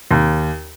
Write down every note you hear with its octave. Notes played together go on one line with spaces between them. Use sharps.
D#2